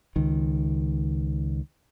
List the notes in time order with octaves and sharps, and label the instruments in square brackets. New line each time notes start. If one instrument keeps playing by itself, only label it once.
[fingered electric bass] C#2 D#3